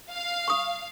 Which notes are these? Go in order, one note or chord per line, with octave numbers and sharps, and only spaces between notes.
F5
C#6 D#6